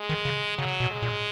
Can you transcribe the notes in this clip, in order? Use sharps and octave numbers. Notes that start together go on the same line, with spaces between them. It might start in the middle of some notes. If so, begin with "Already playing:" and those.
Already playing: G#3
D#3
C#3
C#3 F#3
B2
G#3
A#2